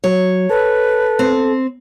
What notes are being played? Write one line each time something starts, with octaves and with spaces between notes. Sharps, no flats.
F#3 C#5
A4 B4
C4